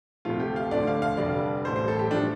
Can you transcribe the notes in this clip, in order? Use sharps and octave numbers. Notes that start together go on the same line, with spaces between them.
D2 C3 F3 A3 F4
G4
F5
D2 D3 F3 A3 D5
F5
F5
F1 F2 D3 G3 D5
A1 A2 G3 C5
C5
A4
G4
F3 A3 D4